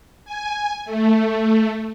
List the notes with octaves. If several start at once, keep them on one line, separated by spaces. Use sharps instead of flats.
G#5
A3